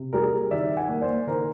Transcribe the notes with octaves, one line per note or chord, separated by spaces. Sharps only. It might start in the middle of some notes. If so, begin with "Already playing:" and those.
Already playing: C3
G3 G#4 A#4
D#3 D5 E5
F#5 G#5
A#3
C5 D5
D#3 A#4 C5